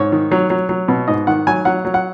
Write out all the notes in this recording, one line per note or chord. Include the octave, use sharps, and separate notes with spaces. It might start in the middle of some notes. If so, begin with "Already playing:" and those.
Already playing: G#2 C#5
D#3
F#3
F#3
F#3
B2
G#2 D#5
D#3 F#5
F#3 G#5
F#3 F#5
F#3
F#5